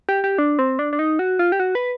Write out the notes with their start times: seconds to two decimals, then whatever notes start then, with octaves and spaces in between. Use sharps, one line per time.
0.09 G4
0.24 G4
0.38 D4
0.59 C4
0.79 D4
0.93 D4
0.99 D#4
1.19 F#4
1.39 F4
1.52 G4
1.60 F#4
1.75 B4